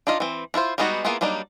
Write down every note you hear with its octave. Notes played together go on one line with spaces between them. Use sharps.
D4 D#4 F4 D#5
E3 C4
D4 E4 F4 C5
G3 G#3 B3 D#4 F#4
A#3 B3 E4 F4 G#4
F#3 G3 A#3 D4 D#4